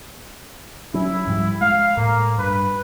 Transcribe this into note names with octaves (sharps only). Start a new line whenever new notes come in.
F#3 C#4 E4
G#2 F3 G3
G#3 F5
A2 A#3
G2 B4